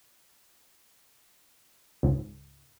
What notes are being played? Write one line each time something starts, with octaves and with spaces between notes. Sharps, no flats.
C#2 G#2